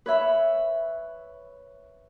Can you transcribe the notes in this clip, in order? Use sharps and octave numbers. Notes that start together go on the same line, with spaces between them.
B4 C#5 E5 B5